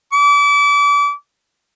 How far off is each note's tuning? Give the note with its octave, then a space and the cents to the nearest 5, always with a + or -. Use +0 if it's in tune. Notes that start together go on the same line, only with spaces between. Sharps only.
D6 -35